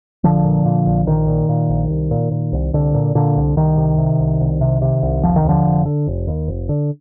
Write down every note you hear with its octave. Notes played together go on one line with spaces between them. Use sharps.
A#1 D3 F3
A#2
A#2
A#1
A#1 D#3
A#2
A#2
A#1
C2
A#2
A#2
C2
C2 D3
A#2
A#2 D3
C2
C2 D#3
C3
C3
C2
C2
C3
C3
C2
F1 F3
D#3
D#2 D3 F3
F1
D3
F1
D#2
F1
D3